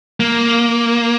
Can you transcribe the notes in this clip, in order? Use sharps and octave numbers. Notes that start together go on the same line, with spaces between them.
A#3